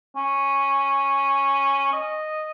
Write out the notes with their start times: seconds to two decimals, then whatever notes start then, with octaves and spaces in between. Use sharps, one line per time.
0.16 C#4
1.93 D#5